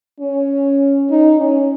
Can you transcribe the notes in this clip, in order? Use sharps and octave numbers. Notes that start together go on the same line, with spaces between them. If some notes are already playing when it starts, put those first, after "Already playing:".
C#4
D#4
C#4